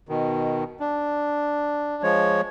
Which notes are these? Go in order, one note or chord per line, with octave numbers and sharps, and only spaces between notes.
B2 D#3
D4
F3 G#3 C#5